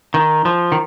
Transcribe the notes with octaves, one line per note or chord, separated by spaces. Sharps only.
D#3
F3
D#3